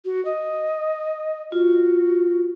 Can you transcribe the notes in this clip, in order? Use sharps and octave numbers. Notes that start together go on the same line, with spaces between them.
F#4
D#5
F4 F#4